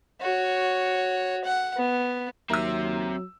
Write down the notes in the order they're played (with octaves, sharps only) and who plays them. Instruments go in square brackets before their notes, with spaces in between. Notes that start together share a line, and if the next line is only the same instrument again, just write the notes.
[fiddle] F#4 C#5
F#5
B3
[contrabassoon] D#2 [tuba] F#3 [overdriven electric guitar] C4 E5 [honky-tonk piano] A#4 E6